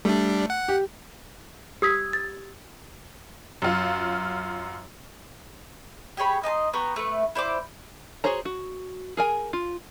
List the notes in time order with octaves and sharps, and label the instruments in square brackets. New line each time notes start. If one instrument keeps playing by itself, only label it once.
[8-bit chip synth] G3 D4 [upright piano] A3
[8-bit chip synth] F#5
[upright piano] G4
[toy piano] G4 D#6 [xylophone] E6 G#6 B6
[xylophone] A6
[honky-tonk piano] F#2 F4
[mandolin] G4 G#4 C#5 B5
D#4 D#5 A5 C6
B3 G4 A#5 C#6
A3 B4
E4 C5 D5 D6
[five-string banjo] F#4 G#4 C5 C#5 A#5
F#4
G#4 A#4 G#5
F4